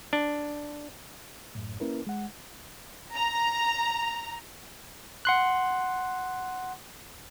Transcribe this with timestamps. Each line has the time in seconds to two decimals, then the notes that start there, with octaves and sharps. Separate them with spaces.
0.13 D4
1.55 F#2 A2
1.80 A#3 C#4 E4 A#4 B4
2.07 G#3 F#5
3.15 A#5
5.25 F#5 C6 F#6